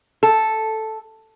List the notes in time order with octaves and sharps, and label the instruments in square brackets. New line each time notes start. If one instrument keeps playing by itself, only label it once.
[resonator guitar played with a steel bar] A4